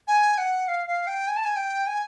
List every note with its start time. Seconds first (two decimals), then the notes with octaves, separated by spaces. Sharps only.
0.08 G#5
0.38 F#5
0.68 F5
0.88 F5
1.07 G5
1.28 G#5
1.37 A5
1.45 G#5
1.56 G5
1.87 G#5